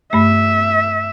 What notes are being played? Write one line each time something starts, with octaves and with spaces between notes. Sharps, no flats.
G2 A3 E5